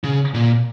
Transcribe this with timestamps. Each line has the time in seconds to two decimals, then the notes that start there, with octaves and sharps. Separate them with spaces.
0.04 C#3
0.34 A#2